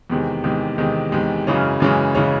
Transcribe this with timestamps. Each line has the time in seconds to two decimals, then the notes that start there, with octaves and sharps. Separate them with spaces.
0.10 E2 C3 D#3 G#3
0.44 E2 C3 D#3 G#3
0.78 E2 C3 D#3 G#3
1.12 E2 C3 D#3 G#3
1.47 F#2 C#3 E3 G#3 C#4
1.80 F#2 C#3 E3 G#3 C#4
2.15 C#3 E3 G#3 C#4